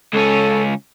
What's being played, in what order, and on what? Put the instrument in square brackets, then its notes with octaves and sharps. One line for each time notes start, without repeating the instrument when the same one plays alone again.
[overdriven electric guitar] C#2 C#4 [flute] A4